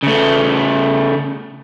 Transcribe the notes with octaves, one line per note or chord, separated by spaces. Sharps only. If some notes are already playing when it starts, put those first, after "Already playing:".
C#3 A3